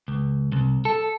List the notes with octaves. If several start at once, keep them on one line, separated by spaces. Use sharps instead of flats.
C#2
C2
A4